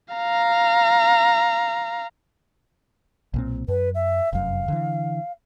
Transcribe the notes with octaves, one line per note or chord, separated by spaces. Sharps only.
F5 A#5
B1 A#2 C4
F#2 B4
E5
F1 F#2 F5
D3 E3